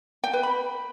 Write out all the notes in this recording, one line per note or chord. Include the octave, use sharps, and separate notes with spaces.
G5
B4
B5